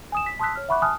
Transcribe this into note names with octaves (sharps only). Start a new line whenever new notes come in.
G#5 D#6 E7
B6
A5 C6 D#6 E6 F#6 B6
C#5 F6
E5 F#5 B5 C#6 D6 F#6
G#5 A5 D#6 F6 F#6